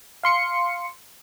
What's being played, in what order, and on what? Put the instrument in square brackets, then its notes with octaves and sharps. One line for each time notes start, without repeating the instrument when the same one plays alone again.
[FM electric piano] F5 C6 C#7